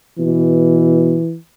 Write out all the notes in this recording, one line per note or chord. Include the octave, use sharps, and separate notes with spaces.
B2 E3